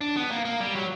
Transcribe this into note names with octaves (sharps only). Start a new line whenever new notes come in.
D4
B3
A#3
A#3
G3
F#3